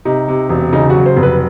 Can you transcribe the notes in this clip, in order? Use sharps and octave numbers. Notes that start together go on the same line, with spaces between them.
C3 D#4
C3
E1
C#3 D#4
F#3 F#4
C5
F1
B4